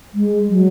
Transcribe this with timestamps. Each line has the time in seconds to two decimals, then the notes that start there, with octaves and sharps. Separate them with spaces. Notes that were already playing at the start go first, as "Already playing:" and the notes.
0.14 G#3
0.49 F#3